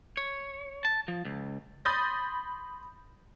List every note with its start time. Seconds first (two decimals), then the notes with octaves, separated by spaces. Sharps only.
0.17 C#5
0.85 A5
1.08 F3
1.25 C#2
1.85 B5 C6 D#6 G6 A6 A#6